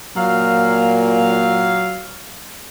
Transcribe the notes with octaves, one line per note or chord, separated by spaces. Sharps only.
A#2 F#3 F5